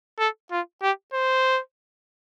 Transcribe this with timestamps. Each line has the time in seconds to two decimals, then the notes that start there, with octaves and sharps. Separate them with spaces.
0.19 A4
0.51 F4
0.82 G4
1.14 C5